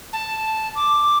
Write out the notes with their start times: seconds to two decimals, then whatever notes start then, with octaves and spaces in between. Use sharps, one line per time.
0.13 A5
0.76 D6